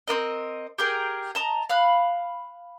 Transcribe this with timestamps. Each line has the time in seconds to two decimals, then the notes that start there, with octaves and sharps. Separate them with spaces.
0.08 C4 D4 A#4 D#5
0.78 G4 G#4 A#4 G5
1.35 D#5 A5 A#5
1.70 F5 B5 F#6